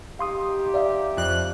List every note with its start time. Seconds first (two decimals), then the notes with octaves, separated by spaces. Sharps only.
0.19 D#4 G4 F5 C6 D#6
0.74 D5 E5 F5
1.17 F2 F#6